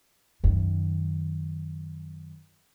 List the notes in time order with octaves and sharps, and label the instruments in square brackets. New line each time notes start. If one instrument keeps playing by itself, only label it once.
[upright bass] F#2 D#3